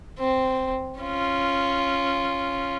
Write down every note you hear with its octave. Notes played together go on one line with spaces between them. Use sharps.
C4
C#4 F4